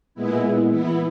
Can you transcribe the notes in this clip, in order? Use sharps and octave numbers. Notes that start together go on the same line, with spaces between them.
A#2 G#3 B3 E4
E3 B3 E4